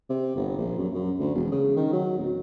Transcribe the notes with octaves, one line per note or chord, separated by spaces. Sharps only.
C3
G1
A#1
F#2
F#2
D2
E1
C#3
D#3
F#3
D1